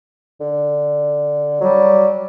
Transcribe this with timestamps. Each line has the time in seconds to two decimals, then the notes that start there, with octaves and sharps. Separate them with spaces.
0.41 D3
1.61 F#3 G3